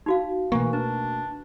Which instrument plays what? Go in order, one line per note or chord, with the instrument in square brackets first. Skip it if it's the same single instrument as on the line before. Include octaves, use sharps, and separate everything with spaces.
[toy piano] D#4 F#4 F5
[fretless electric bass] B2 A3 A#3 [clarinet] E3 [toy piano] C#6
[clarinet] D4 [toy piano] B4